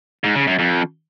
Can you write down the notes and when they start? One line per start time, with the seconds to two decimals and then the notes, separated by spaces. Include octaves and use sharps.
0.24 G#2
0.35 C#3
0.47 F#2
0.59 F2